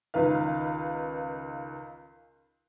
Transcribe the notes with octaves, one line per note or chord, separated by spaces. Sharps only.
C#2 D#3 B4 F5